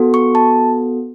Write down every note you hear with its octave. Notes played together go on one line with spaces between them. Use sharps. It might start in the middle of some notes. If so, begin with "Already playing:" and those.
Already playing: B3 F#4 A4
C#6
A5